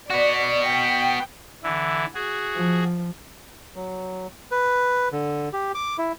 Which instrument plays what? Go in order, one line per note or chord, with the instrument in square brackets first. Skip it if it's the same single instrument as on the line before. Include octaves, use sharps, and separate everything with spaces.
[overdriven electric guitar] B3 F#4 [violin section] D5
[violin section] G5
[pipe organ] D3 E3 E4
F#4 G#4
[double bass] F3
[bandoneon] F#3
B4
D3
G4
D6
E4